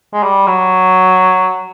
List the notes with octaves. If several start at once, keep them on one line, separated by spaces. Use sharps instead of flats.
G#3
G3
F#3